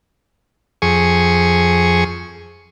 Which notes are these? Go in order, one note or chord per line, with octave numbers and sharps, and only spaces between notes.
F2 G#4 C#6